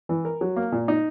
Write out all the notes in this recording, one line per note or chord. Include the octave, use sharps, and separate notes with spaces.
E3
A#4
F#3
A#3
A#2
D#4